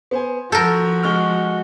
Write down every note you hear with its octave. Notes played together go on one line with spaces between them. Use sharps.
B3 C5 G#5
F3 F#4 A4 A#4 G6
G#3 C#6 F6